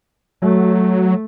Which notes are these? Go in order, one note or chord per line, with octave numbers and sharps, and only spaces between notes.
F#3 A3